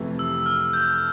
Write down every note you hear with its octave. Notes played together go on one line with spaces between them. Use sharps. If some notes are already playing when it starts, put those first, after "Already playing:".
Already playing: F2 C3 E3 A3
E6
F6
G6